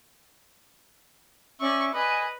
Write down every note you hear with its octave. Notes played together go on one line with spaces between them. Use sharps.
C#4 D5 E5 C#6
B4 D#5 G#5